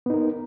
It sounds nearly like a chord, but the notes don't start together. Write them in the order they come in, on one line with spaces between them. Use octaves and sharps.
B3 D#4 A#4